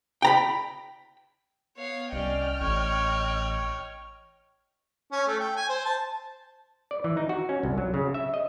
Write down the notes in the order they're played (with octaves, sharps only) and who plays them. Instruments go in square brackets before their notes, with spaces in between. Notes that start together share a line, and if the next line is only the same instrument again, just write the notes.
[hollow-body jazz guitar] G5 A#5 B5
[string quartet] B3 C#5 F5
[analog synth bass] C2 [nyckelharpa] C#4 D5 [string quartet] D#5 G5 F6
[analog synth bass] A1 [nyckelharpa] C#5
[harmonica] C#4
A3
G5
G#5
C5
A5
[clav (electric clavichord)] D5
E3
D#4
F#4
C#4
C2
F#3
C#3
E5
D#5